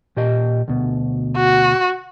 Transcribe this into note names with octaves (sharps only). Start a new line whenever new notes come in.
A#2 G4 D#5
D2 B2
F#4